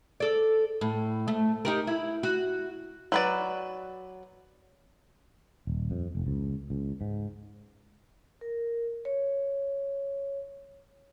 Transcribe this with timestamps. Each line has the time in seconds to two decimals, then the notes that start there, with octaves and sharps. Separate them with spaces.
0.20 A4 D5
0.81 A2
1.28 A3
1.65 D#4 G4 A#4
1.87 E4
2.23 F#4
3.12 F#3 B4 D5
5.67 D#1
5.91 F2
6.15 F1
6.27 C#2
6.70 C#2
7.01 G#2
8.41 A#4
9.05 C#5